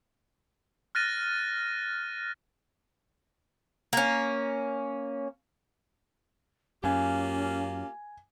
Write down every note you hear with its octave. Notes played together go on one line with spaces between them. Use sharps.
F6 F#6 A6 A#6 D#7
A#3 C#4
F#2 A#3 C#4 F4 G4 G#5